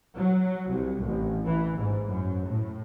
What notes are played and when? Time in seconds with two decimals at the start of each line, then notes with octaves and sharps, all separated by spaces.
0.16 F#3
0.70 C2
1.03 A1
1.44 E3
1.78 G#2
2.09 F#2
2.47 A2